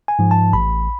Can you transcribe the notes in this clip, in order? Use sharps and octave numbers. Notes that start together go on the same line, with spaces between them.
G#5
G#2 F3
A5
A1 B5